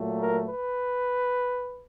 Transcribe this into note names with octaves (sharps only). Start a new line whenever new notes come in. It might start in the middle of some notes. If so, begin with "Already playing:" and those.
Already playing: A#2 F#3 A3
A#4
B4